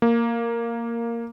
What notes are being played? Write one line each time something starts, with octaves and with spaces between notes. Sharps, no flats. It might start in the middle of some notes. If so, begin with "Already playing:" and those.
A#3